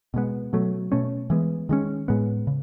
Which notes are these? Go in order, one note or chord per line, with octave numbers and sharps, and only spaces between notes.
B2 G#3 B3
B2 F#3 A3
B2 A3 C#4
E3 G#3 B3
D#3 G#3 C#4
A2 G#3 B3
C#3